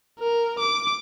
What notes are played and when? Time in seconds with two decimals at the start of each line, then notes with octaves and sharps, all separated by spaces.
0.20 A#4
0.60 D6